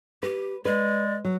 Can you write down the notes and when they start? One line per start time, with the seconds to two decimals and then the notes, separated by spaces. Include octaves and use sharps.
0.23 G4 B4
0.65 G#3 B4 D5
1.25 F#3